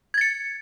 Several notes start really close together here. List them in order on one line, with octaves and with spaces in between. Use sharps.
G#6 A6 C#7